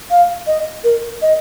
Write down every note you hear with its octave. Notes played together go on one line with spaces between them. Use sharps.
F5
D#5
A#4
D#5